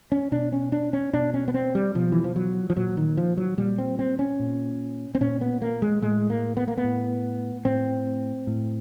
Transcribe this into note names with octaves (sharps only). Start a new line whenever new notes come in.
C#4
B2 D4
C#4
D4
C#4
B2 D4
C#4
B3
C4
G3
B2 F3
E3
F3
F#3
F3
A#2 F#3
D#3
F3
F#3
A#2 G3
C4
C4
C#4
A#2
C4
A#2 C#4
B3
A#3
G#3
A2 G#3
A#3
B3
A#3
B3
A2
A2 C4
A2